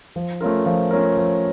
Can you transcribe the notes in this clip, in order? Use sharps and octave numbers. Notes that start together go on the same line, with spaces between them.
F3
A3 C#4 F4 A#4
F3
A3 C#4 F4 A#4
F3